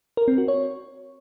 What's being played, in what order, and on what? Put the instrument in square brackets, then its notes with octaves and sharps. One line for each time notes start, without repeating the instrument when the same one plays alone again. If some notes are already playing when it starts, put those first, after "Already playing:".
[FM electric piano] A#4
C4
F#4
C#5